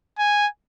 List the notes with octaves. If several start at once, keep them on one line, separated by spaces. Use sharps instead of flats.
G#5